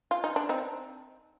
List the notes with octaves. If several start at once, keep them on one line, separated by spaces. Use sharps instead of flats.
F4
D#4
D4
C4 D#4